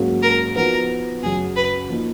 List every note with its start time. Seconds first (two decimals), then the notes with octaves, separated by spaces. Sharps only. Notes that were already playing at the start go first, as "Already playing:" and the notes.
Already playing: G#2 F#3 A#3 C#4 F#4
0.23 A#4
0.56 F3 B3 D#4 F#4 A#4
1.22 F#2 C#3 F#3 G#4
1.56 B4
1.89 F3 A#3 D#4